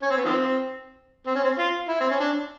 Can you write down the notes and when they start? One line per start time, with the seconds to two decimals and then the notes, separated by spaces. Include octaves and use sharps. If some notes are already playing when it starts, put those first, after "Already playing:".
0.02 C#4
0.10 C4
0.17 B3
0.25 D#3 F3 C4
1.26 C4
1.35 C#4
1.44 C4
1.58 F4
1.89 E4
2.00 C4
2.11 C#4
2.20 D4